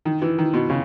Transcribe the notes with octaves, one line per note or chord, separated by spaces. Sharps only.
D#3
E3
D#3
B2
C#3